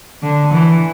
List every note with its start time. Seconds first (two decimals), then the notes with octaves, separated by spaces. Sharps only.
0.23 D3
0.52 E3